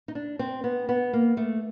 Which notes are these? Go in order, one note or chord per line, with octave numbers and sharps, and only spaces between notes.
D#4
D4
C4
B3
B3
A#3
A3